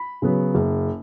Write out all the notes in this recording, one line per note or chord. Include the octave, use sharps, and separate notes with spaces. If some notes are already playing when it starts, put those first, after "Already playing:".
Already playing: B5
C#3 F#3 B3
F#1